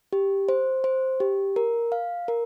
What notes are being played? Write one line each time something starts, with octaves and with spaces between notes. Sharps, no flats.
G4
C5
C5
G4
A#4
F5
A#4